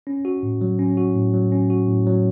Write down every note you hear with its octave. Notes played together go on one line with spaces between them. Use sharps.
C#4
F#4
A2
F#3
C#4
F#4
A2
F#3
C#4
F#4
A2
F#3